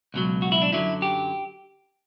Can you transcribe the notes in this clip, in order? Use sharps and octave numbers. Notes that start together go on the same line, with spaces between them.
C#2 B2 F#3
F#4
E4
D4
F#2 D3 F#3 E4
G4